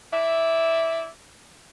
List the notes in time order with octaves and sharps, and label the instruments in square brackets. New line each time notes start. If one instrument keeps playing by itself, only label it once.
[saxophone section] E4 D5 E5